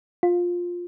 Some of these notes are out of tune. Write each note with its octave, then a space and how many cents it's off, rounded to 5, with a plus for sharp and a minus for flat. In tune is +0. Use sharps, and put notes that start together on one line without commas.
F4 +10